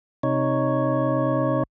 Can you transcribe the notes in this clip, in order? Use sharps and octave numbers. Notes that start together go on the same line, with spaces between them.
C3 D#4 C#5